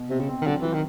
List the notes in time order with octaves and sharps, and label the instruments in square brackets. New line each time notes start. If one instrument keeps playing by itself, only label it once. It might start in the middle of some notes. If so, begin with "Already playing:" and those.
Already playing: [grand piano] B2
[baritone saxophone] C3 [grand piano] C4
[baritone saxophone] C#3
[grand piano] C4
[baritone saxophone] D#3
[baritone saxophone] D3 [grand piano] F#3
[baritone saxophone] E3 [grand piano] F#3
[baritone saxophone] D#3